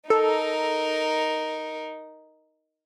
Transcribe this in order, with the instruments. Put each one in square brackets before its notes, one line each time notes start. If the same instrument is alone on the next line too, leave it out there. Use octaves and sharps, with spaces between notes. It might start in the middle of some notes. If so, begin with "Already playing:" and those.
[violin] D#4 A#4 [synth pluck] A4